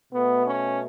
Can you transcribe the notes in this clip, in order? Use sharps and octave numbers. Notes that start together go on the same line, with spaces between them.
B2 A3 B3
C#4